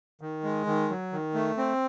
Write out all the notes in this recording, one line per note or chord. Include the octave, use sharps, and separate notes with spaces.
D#3
G#3
D#3
F#3
D#3
A3
C4